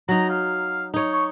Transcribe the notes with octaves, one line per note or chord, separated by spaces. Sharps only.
F#3 D#4 A#5
F5
D#4 C#5
C#6